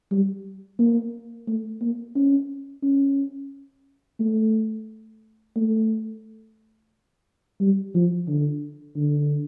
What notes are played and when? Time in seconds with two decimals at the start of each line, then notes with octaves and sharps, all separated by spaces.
0.12 G3
0.79 A#3
1.48 A3
1.82 A#3
2.16 C#4
2.83 C#4
4.20 A3
5.56 A3
7.60 G3
7.95 F3
8.28 D3
8.96 D3